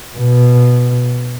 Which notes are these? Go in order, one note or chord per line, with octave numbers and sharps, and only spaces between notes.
B2